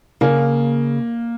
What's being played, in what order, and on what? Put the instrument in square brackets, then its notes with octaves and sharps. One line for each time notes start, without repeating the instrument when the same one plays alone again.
[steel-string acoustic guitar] C#3 [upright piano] A#3